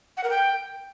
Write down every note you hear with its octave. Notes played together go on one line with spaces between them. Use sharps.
F#5
A#4
G5